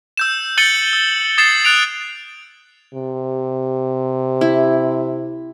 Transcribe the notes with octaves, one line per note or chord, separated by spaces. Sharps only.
E6 G6 E7
G6 A6 C#7 D#7 F#7 G7
E6
D#6 G#6 A6 C7 E7
F#6 A6 D7 F7
C3
E4